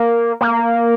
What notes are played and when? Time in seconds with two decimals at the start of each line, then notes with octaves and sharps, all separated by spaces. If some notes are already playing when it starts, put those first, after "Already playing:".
Already playing: A#3
0.41 A#3